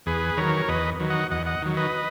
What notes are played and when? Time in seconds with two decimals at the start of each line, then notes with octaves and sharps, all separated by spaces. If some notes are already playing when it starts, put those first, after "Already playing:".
0.06 E2 G#4 B4
0.37 D#3 F#3 A#4 C#5
0.68 E2 B4 D#5
1.00 D#3 F#3
1.10 D#5 F#5
1.31 E2 D#5 F#5
1.46 D#5 F#5
1.62 D#3 F#3
1.77 B4 D#5